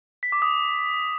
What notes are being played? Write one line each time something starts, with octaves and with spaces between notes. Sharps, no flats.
B6
D6
D#6